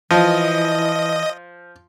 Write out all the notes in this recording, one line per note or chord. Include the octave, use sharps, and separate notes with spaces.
E3 F3 D#5